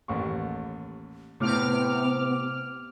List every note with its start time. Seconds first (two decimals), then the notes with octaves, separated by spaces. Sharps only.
0.08 A1 D#2 C#6
1.40 A2 C3 B3 D6 F6